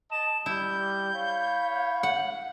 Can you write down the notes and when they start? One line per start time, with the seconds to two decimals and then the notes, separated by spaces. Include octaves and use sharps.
0.12 D#5 A5 E7
0.46 G3 E4 G6
1.13 C#5 F5 B5
2.03 F#5